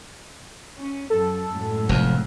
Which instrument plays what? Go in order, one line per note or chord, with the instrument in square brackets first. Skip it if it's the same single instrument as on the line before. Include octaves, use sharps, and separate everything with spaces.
[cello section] C#4
[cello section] F#2 [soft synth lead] A4
[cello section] F#2 A2 G#3
[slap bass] F1 F2